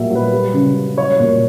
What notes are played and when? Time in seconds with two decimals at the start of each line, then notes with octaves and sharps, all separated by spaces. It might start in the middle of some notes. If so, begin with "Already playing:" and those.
Already playing: A#2 F#3 G3 E5
0.11 F#3 B4
0.32 G3
0.54 C#3
0.75 G3
0.97 F#3 C#5
1.20 A#2